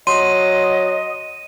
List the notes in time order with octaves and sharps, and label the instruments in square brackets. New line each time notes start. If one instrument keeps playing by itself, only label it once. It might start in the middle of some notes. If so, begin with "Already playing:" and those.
[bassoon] F#3 [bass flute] D#5 [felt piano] C6 [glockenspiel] D#7